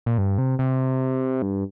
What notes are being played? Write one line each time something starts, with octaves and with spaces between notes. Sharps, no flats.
A#2
G2
C3
C3
G2